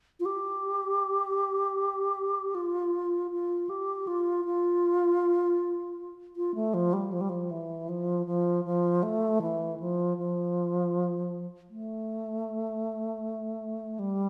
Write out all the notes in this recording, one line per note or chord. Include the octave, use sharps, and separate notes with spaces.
F4
G4
F4
F4
G4
F4
F4
F4
A3
F3
G3
F3
G3
F3
E3
F3
F3
F3
A3
E3
F3
F3
A3
G3